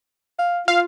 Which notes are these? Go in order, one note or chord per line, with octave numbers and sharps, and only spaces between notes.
F5
F4 F5